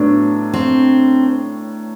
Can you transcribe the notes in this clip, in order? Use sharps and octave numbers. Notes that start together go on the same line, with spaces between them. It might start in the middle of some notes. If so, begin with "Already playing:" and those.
Already playing: A2 F#3 B3 D4
C4